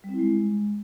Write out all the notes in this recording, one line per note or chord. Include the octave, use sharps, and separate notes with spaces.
G3
C4
E4
G#3